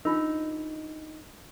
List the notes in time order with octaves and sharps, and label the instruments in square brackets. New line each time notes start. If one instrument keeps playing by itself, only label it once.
[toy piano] D4 F4 A#4 [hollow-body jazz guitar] D#4